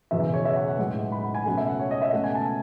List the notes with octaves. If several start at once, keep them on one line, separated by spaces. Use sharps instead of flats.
F#1 E2 B2 F#3 E5
C#5
E5
F#5
F#5
B1 A2 G#3
B5
F#5
G#5
C#2 B2 F#3 A3 F#5
E5
F#5
C#5
D#5
E5
C#2 B2 A3 F#5
G#5
A5